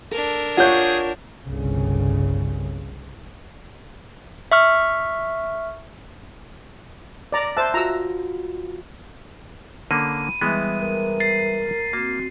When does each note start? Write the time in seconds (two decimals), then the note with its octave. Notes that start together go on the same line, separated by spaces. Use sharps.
0.12 D4 A4 A#4
0.57 F4 G#4 C#5 F#5 G6
1.46 G1 C2 C#3
4.52 E5 C#6 F6
7.32 D5 A#5
7.57 C5 E5 A5 E6 F#6
7.74 F4 F#4 A#5 E6
9.91 D3 A#3 C#4 B5 D#7
10.41 E3 G3 G#3 B3 B4 E5
10.80 A#4
11.20 A6 C7
11.93 A#3 C4 F#4